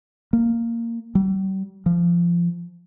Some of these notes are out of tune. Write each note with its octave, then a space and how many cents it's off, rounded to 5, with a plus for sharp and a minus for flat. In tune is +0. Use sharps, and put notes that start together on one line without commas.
A#3 -10
G3 -40
F3 -20